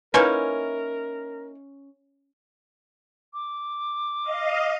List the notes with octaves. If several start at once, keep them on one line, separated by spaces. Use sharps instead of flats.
A#3 C#4 D#4 E4 A#4 B4 G#5 C6
D6
D#5 F5